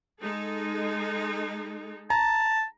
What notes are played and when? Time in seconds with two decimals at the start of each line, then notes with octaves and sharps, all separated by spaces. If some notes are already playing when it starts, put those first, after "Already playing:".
0.22 G#3 D#4 A4
2.10 A5 A#5